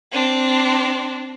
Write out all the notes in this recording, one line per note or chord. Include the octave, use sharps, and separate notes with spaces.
C4 D4